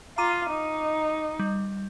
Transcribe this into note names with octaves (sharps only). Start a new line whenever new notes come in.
F4 A#5 D6 D#7
D#4
G3